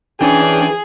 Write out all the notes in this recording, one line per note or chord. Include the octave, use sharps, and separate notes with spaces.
E3 C#4 D4 G#4 G5